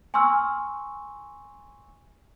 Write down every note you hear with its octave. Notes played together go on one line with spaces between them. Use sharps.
G#5 C6 C#6 E6 F6